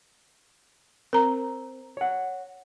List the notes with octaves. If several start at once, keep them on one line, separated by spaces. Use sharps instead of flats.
C4 A#4 A#5
C#5 F#5